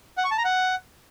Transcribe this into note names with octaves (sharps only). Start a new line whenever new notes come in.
F#5
C#6
A5
A#5
F#5